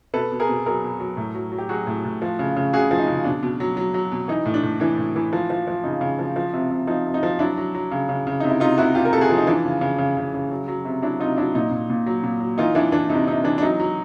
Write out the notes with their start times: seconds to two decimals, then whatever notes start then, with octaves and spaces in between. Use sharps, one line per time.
0.14 B2 A4 B4
0.32 B2
0.40 G#4 A#4
0.49 B2
0.66 F#3 G#4 A#4
0.83 B2
1.00 F#3
1.17 A2
1.35 F#3
1.52 F#3
1.58 G4
1.69 F#3 F#4 G#4
1.87 A2
2.05 A2
2.22 F3
2.39 C#3
2.56 C#3
2.73 C#3 F#4 G#4
2.91 F3
2.99 D#4
3.07 C#3
3.24 B2 D4
3.43 B2
3.60 F#3
3.77 F#3
3.94 F#3
4.12 B2
4.28 E3 D#4
4.45 A2
4.54 D4
4.63 A2
4.80 E3 D4
4.98 A2
5.16 E3
5.33 F3
5.50 F3
5.68 F3
5.84 C#3 D#4
6.01 C#3
6.19 F3
6.36 F3
6.54 C3
6.71 C3
6.87 F3 D#4
7.06 C3
7.14 D#4
7.23 F3
7.39 F#3 D4 E4
7.58 F#3
7.75 F#3
7.91 C#3
8.09 C#3
8.27 C#3
8.40 C3 D#4
8.50 E4
8.60 C3 D#4 F4
8.78 C3 E4 F#4
8.95 C3 F4 G4
9.05 A#4
9.13 C3 A4
9.21 F#4 G#4
9.30 F3
9.37 D#4
9.47 E3 D4
9.65 C#3
9.81 C#3
9.98 C#3
10.17 C#3
10.34 C#3
10.51 F#3
10.68 F#3
10.85 C3
11.02 F#3 D4 E4
11.20 C3 D#4 F4
11.37 F#3 D4 E4
11.55 A#2 D#4
11.71 A#2
11.90 A#2
12.06 F#3
12.24 A#2
12.40 F#3
12.58 E3 D#4 F4
12.75 E3 D4 E4
12.92 E3 D4
13.10 C3 D#4
13.27 C3 D#4
13.44 E3 D4
13.58 D4
13.62 F#3 D#4
13.80 F#3